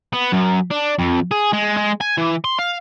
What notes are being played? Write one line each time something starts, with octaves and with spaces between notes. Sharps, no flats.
B3
F#2
D4
F2
G#4
G#3
G#3
G#5
E3
C6
F5